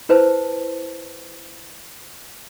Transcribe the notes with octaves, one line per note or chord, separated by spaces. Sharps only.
E4 B4 C5 A5